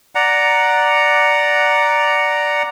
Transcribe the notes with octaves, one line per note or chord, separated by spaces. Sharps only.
D5 F#5 A#5